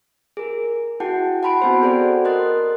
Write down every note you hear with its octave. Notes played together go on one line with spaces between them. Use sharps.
G#4 A#4
E4 F#4 G#4 F#5 G5 A5
F#5 A5 B5 C6 D7
B3 C4 F#4 C5 G5
F#4 G#4 A4 C5 D5 F#5
A#4 D#5 C6 F#6 A6